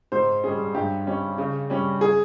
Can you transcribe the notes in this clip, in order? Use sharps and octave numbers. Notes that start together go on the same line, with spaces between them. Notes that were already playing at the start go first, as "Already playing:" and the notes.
G#2 C5
G3 C#4 G#4
G2 G4
G3 C#4
C#3
G3 C#4
G#4